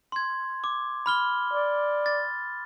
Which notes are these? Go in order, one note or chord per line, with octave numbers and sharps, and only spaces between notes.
C6 G#6
D6
B5 F6 G7
D5
A6